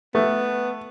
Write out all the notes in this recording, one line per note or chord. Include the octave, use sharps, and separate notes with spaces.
A3 B3